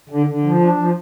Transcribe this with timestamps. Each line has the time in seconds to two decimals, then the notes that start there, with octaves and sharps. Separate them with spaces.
0.09 D3
0.26 D3
0.43 F3
0.60 D4
0.76 F3